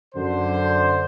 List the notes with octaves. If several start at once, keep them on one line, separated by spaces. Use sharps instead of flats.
F#2 D3 C5